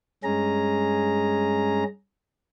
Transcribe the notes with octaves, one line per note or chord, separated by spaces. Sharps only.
G2 G#3 C#4 G#4 A#5